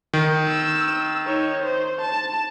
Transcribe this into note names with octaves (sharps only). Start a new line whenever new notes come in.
D#3
E6
D#4 C#5
C5
A5